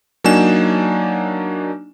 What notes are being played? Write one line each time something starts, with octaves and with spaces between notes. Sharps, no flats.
F#3 A#3 D4 D#4 G#5 E7